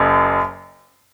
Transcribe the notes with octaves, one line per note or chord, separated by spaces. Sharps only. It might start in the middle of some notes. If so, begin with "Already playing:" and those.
Already playing: F#1 F#2